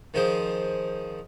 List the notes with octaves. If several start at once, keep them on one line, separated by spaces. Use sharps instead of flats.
D#3 F3 G#4 C5